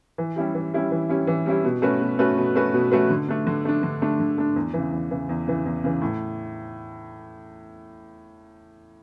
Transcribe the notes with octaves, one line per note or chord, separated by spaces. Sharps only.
E3
G3 C#4 E4 G4
E3
G3 C#4 E4 G4
E3
G3 C#4 E4 G4
E3
G3 C#4 E4 G4
B2
A3 C#4 F#4 B4
B2
A3 C#4 F#4 B4
B2
A3 C#4 F#4 B4
B2
A3 C#4 F#4 B4
D3
A3 D4
D3
A3 D4
D3
A3 D4
D3
A3 D4
E2
C#3 E3
E2
C#3 E3
E2
C#3 E3
E2
C#3 E3
A2